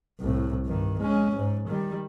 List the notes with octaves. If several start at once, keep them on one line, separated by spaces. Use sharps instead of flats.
C2 A2
G2 D#3
G#3 C#4
G#2
D#3 G3